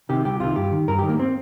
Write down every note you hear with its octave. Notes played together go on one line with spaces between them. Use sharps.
C3 D#3 G4
C2 G4
C3 D#3 F4
G2 G4
D#3
G2 A#4
G4
D#3
A#3
C4